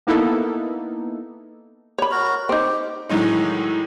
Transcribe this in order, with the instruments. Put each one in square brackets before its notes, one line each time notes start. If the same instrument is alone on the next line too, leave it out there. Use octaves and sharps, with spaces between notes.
[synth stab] A#3 B3 D#4 E4 A4
[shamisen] C#5 B5
[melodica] F#4 A#4
[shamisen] C4 D#4 [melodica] G4
[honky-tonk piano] A2 D#3 E3 F#3 G#3 D#4